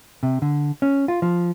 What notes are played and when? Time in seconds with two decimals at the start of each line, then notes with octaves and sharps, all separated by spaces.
0.23 C3
0.42 D3
0.82 C#4
1.08 F4
1.22 F3